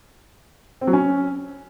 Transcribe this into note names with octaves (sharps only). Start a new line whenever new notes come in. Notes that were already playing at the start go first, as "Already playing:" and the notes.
C4
F#3
C#4